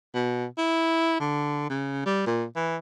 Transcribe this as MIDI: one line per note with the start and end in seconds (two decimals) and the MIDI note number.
0.14 0.46 47
0.58 1.18 64
1.20 1.65 50
1.70 2.02 49
2.06 2.23 55
2.26 2.45 46
2.56 2.76 52